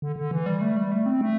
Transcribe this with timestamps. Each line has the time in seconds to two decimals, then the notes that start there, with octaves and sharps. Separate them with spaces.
0.02 D3
0.16 D3
0.31 E3
0.46 G3
0.61 A3
0.77 G3
0.91 A3
1.06 C4
1.21 A3